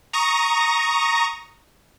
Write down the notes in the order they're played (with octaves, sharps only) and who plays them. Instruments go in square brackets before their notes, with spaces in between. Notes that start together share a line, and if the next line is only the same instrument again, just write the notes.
[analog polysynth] A#5 C#6 D#6 A#6